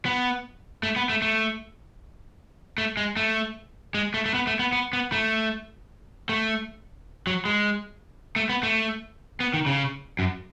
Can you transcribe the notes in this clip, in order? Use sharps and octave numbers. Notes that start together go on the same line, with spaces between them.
B3
A3
B3
A3
A3
A3
G#3
A3
G#3
A3
A3
B3
A3
B3
B3
B3
A3
A3
F#3
G#3
A3
B3
A3
B3
D#3
C#3
F#2